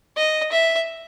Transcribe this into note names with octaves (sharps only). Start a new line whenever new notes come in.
D#5
E5